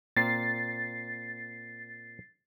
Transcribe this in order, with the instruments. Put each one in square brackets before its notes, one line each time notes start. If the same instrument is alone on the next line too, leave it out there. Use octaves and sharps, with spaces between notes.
[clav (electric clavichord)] A#2 A#3 C4 [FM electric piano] A6 C7